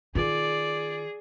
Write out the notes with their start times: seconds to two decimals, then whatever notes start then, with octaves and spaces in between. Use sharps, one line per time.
0.15 D#3 F4 G#4 D5